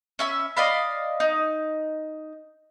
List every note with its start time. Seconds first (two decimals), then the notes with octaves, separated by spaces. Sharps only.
0.19 C#4 E5 B5
0.57 D5 D#5 F5 B5
1.20 D#4